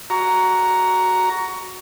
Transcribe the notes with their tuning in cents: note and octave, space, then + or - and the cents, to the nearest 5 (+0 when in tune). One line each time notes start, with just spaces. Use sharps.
F#4 +0 A#5 +0 C#6 +20